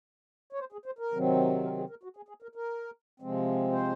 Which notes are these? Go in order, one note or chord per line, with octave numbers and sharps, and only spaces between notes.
C#5
C5
G#4
C5
A#4
C3 D#3 F#3 C4
A#4
G#4
A#4
F#4
G#4
G#4
A#4
A#4
C3 F3 G#3 C4
C5